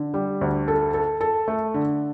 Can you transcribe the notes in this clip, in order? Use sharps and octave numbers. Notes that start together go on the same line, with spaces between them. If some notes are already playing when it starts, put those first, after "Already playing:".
Already playing: D3
G3
D2
A4
A4
A4
A3
D3